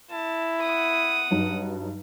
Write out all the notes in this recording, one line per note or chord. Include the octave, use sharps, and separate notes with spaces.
E4 A5
F#5 D#6
G2 F#3 D#4